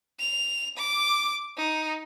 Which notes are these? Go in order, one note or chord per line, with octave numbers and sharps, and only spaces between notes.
F7
D6
D#4